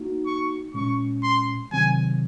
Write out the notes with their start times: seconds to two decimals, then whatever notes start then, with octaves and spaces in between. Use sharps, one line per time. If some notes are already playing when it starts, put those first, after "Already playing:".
Already playing: A#3 D#4 F#4
0.26 C#6
0.74 A#2 G#3 C#4 C#6
1.23 C6
1.72 C3 D#3 F#3 C4 G#5